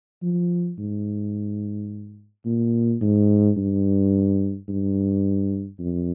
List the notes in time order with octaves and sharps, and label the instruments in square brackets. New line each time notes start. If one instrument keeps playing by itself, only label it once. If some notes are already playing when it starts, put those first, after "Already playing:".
[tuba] F3
G#2
A#2
G#2
G2
G2
F2